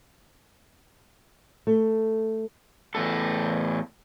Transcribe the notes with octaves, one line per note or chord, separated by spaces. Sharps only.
A3
E2 A2 A4